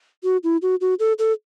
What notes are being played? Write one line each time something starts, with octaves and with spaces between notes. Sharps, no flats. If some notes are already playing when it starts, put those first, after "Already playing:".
F#4
E4
F#4
F#4
A4
A4